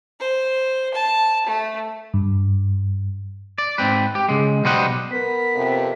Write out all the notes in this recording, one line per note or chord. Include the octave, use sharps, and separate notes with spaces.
C5
A5
A3
G2
D5
G#2 C4 B4
G4
C#3 G#3
B1 B2 G3 C5 D#5 F#5
B3 A#4 B6
F2 C3